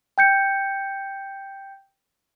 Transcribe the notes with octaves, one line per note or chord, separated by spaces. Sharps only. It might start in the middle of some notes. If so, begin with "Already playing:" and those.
G5 G6 C#7